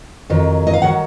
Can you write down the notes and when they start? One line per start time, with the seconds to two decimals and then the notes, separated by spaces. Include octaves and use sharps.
0.29 F2 D#3 F#3
0.67 D#5
0.74 F5
0.82 D#3 F#3 F#5